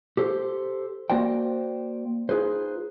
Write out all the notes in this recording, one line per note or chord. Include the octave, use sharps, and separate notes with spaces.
G4 A4 C5
A#3 F#4 C5 D5 G5
D#4 F4 G#4 B4 C5